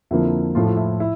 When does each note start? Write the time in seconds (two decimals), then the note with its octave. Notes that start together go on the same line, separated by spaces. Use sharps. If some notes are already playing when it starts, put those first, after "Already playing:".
0.11 F2 D3 F3 A#3 E4
0.55 A2 F3 A3 F4
0.66 F4
0.77 E4
1.00 E4